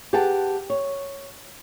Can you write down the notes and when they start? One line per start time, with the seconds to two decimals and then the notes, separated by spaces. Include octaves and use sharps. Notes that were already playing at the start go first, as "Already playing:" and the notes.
0.13 G4 G#4 B4 F#5 G5 A5
0.70 C#5